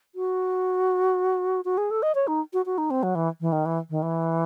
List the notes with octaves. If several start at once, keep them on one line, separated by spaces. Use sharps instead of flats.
F#4
F#4
G#4
A4
D#5
C#5
D#4
F#4
F#4
D#4
C4
F#3
E3
E3
D#3
E3
D#3
E3